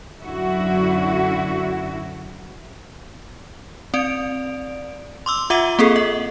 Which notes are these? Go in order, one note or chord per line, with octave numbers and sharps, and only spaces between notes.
F#2 D3 E4 F#4
C4 D5 D7
C6 D6 E6
F4 E5 F#5 D6 D#7 G7
A#3 C4 G#4 A4
D#5